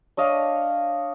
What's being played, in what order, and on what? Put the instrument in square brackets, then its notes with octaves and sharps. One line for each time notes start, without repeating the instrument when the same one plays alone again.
[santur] D4 C#5 D#5 F5